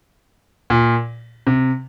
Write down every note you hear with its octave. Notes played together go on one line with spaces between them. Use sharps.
A#2
C3